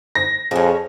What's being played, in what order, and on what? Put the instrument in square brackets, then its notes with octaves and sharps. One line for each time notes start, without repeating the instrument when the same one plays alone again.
[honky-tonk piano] A#6
[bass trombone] F2 [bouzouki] F3 C#4 [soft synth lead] G#4